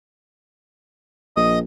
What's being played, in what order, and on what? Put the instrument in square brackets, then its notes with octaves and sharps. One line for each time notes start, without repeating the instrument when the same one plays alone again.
[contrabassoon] A#1 [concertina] D#5 D#6